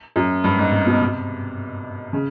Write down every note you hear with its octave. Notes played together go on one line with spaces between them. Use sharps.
F#2
G2
G#2
C3
B2
C3
C#3